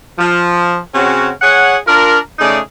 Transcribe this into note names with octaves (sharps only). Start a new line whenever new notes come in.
F3
C#3 C4 C#4 F#4
G#4 C#5 F#5
D4 F4 A#4
C#3 A3 D#4 G#4 D5